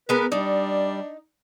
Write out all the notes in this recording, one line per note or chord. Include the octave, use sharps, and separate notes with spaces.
G#3 B3 A#4 B4
G3 D4 D#4